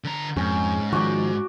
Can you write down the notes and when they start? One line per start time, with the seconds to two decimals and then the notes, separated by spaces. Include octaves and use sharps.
0.04 D3 A#5
0.37 F2 G#2 C#4
0.92 D#3 F3 F#4 D5